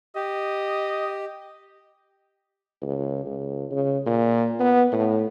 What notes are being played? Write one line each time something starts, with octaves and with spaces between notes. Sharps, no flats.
G4 D#5
C#2
C#2
C#3
A#2
B3
A2